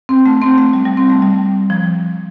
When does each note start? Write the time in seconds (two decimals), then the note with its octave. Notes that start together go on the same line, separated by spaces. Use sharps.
0.09 C4
0.26 A3
0.42 C4
0.58 A3
0.73 G3
0.85 G3
0.97 C4
1.10 A3
1.22 G3
1.70 F3